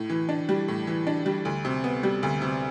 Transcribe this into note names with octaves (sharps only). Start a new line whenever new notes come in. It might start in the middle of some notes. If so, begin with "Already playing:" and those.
Already playing: A2
E3
D4
G3
A2
E3
D4
G3
D2
C3
B3
G3
D2
C3